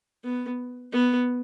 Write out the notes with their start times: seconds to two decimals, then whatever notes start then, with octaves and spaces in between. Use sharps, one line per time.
0.24 B3
0.93 B3